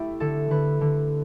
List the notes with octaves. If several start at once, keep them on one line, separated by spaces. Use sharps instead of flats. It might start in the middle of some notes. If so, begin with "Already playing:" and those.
Already playing: A3 E4 G4
D3 A4
D3 B4
D3